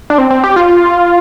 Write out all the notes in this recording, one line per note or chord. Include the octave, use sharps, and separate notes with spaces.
D4
C4
C4
G4
F4